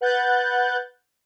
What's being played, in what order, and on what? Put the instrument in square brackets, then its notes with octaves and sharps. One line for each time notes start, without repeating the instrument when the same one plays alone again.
[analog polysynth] B4 F#5 F#6 G6 A6